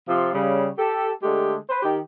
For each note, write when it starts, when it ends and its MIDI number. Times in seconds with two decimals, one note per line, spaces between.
0.09 0.33 48
0.09 0.33 53
0.09 0.33 65
0.33 0.68 49
0.33 0.68 55
0.78 1.10 67
0.78 1.10 69
1.23 1.55 50
1.23 1.55 56
1.23 1.55 57
1.23 1.55 67
1.70 1.79 71
1.70 1.79 72
1.83 1.98 51
1.83 1.98 67